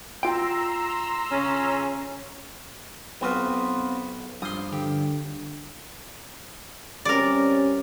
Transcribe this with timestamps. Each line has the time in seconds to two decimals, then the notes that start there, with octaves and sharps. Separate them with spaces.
0.23 F4 G5 A#5 C6 E6
1.31 C#3 C#4
3.21 B1 B3 C4 F4 F#4 B4
4.42 G2 F3 C6 D#6
4.73 D3 G4
7.05 C3 G3 C#4 A#4 D5